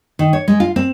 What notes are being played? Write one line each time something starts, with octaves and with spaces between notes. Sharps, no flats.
D#3
C#5
G#3
F4
C4